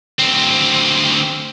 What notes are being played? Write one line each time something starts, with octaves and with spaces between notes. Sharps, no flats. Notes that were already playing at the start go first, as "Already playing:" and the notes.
D2 C4